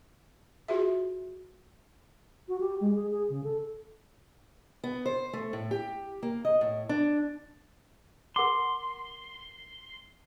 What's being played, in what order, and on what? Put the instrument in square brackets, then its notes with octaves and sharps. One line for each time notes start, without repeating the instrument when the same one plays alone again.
[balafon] F4 F#4 G#4 E5
[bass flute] F#4
G4
G#3
G#4
G#4
C#3
A4
[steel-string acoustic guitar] B3
C5
A3
A2
G4
A#3
D#5
A2
D4
[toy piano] A#4 F#5 D6 [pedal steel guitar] C6